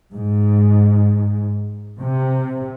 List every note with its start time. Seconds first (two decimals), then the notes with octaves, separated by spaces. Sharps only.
0.13 G#2
1.99 C3